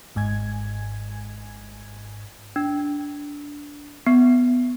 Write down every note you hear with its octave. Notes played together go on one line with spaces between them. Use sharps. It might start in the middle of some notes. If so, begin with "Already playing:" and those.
G#1 G#2 G#5 G#6
D4
B3